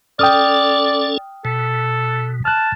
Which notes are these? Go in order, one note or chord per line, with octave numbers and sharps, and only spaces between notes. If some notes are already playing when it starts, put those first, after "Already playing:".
C#4 A4 D5 G5 D#6 F6
B2 A4
A5 F6 F#6